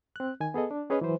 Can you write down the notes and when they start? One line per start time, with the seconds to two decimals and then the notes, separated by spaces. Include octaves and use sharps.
0.16 C4 F#6
0.40 D#3 G#5
0.54 B3 G#4 A4 D#5
0.71 D4
0.90 C#4 G#4 B4 C#5 D#5
1.01 E3 F#3 B4 C5